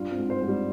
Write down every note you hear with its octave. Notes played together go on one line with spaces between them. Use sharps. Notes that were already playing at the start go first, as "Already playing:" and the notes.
Already playing: G2 F4
C4
G#2
G2 C5
G#2
G3